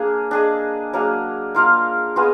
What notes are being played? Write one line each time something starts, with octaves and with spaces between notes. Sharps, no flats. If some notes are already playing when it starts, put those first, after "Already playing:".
Already playing: A#3 D4 G#4
D4 G#4 D#5
F#3 A#3 D4 G#4
A#3 F4 A#4 F5
B3 F4 G#4 D#5